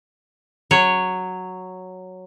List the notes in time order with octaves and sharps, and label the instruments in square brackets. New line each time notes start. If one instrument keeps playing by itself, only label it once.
[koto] F#3 C#5